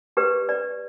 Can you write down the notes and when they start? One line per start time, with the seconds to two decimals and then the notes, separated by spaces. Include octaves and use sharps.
0.17 G4 B4 D5
0.49 G4 B4 D5